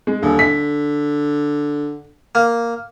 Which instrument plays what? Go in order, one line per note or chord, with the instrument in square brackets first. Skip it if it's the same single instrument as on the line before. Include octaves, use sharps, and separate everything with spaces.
[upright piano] G#3
[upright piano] D#1 [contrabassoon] D3
[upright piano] B6
[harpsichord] A#3